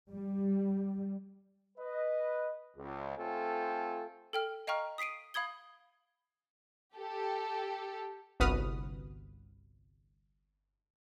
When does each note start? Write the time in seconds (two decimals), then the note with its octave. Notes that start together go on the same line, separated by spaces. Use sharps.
0.12 G3
1.78 B4 D#5
2.77 C#2
3.18 A3 C4 F4 A4 G5 G#5
4.33 A4 G5 F6
4.67 D#5 F5 G5 A#5 C#6 F6
4.98 D#6 B6 C7 D7 D#7
5.34 F5 B5 D#6 G#6 G7
6.97 G4 A4
8.40 G1 C2 F#4 B4 D#6 F6